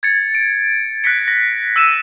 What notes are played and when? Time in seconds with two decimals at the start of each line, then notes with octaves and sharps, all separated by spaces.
0.03 G#6 A6 C#7
0.35 D7
1.04 F#6 A#6 B6 C#7
1.28 A#6
1.76 E6 A#6 D#7 E7